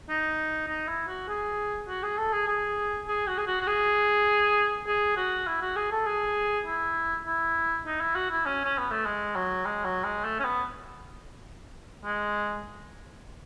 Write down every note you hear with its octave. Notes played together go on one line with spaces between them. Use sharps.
D#4
D#4
E4
F#4
G#4
F#4
G#4
A4
G#4
G#4
G#4
F#4
G#4
F#4
F#4
G#4
G#4
F#4
E4
F#4
G#4
A4
G#4
E4
E4
D#4
E4
F#4
E4
C#4
C#4
B3
A3
G#3
F#3
G#3
F#3
G#3
A3
C#4
B3
G#3